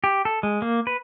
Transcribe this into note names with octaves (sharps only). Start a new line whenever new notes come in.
G4
A4
G#3
A#3
B4